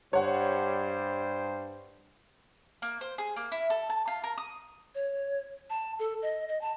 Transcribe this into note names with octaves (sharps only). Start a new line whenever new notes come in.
G2 G3 C5 C#5 F#5
A#3
C5
G#4
A#3
E4
A4
A5
F4
A#4
D#6
C#5
A5
A4
D#5
D#5
A5